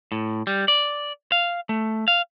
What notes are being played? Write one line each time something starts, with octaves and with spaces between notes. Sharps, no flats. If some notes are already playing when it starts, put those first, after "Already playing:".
A2
G3
D5
F5
A3
F5